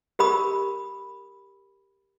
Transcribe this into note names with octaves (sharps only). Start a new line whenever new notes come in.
G4 A#4 B5 D#6